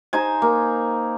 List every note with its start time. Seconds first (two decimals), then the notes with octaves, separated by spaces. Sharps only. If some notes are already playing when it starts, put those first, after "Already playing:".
0.13 D#4 C5 G#5
0.42 A#3